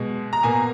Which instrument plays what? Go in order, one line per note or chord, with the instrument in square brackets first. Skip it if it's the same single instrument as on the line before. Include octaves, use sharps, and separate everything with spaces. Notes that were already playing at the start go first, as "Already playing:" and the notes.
Already playing: [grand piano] B2 G#3
A#5
B2 A#3 G#5